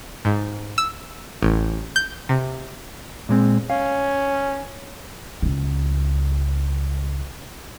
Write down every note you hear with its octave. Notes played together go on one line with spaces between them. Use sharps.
G#2
E6
A1
G6
C3
A#2 G#3 C4
C#4 F5
C#2 C#3